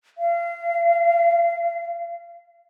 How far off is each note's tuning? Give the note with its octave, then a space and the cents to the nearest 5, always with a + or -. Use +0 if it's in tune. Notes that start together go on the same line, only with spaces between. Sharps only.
F5 -35